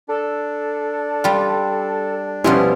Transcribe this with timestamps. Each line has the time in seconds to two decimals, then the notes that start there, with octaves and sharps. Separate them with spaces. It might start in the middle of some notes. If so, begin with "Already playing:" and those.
0.09 D4 A4
1.24 G3 F4
2.44 B2 F3 G3 C#4 E4 C6